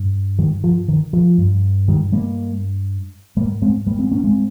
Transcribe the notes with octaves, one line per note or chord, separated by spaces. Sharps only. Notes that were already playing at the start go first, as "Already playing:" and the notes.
Already playing: G2
D#3 G3
F3
D#3
F3
G2
D#3 G3
G3 A#3
G#2 G3 A#3
G#3 C4
G3 A#3
G#3 C4
A#3 C#4
G#3 C4